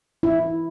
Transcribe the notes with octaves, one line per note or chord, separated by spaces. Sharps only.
E4